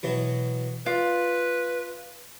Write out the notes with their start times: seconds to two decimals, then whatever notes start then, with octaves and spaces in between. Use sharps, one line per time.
0.03 B2 E3 F#3
0.86 F4 B4 D5